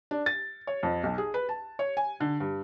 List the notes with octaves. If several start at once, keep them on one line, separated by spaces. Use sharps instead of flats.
D4
A6
C#5
F2
B1
G#4
B4
A5
C#5
G#5
D3
G2